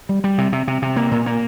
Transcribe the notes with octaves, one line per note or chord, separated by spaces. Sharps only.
G3
G3
C3
C3
C3
C3
A#3
A#2
A#3